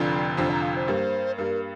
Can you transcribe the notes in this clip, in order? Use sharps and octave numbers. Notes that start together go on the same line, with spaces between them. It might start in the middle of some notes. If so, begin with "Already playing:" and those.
Already playing: F1 F2 D3 F3 D5
F1 F2 D3 F3 C5
A#5
F5
C5
G2 G3 A#3
G2 G3 A#3 A#4